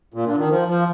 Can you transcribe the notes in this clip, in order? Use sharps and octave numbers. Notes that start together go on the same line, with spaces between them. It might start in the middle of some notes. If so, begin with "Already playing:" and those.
A#2
D3
D#3
F3
F3